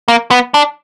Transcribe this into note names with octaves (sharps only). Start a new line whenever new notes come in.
A#3
B3
D4